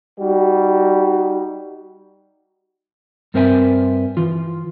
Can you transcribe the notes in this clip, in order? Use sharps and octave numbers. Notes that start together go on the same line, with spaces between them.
G3 D#4 F#4
G2 C4 A#4 C5 E5 G#5
E3 F4